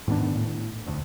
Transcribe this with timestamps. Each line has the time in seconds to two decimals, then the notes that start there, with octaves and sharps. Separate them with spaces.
0.08 G#2 D#3 B3 D4
0.35 A2
0.86 E1 D2